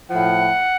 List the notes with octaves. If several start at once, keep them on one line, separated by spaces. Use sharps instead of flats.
A2 F3 F#5